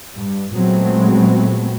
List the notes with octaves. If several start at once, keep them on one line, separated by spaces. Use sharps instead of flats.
G2
A#2 F#3 G#3 A3 B3 C4